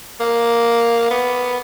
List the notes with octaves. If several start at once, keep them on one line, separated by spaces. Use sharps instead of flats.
A#3
B3